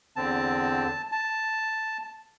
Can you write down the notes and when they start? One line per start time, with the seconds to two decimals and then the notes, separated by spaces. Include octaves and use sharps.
0.16 E2 D3 C4 A5
1.12 A5